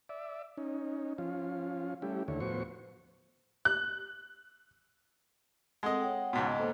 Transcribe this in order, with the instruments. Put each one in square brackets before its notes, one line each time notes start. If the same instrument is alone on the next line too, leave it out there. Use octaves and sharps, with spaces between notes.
[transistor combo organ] D5 E5
C#4 D#4
F3 C#4 F4
G3 A3 C#4 E4 G4
D#2 D3 A3 E4 C#5
A2 F3 B3 F#4 C5 C#6
[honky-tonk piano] F#6
[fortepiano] G#3 D#5 [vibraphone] C4 A4 F#5
[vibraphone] C#5 F#5 G5
[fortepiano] C#2 G#2 B2
[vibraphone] D#5
A#3 A4 C5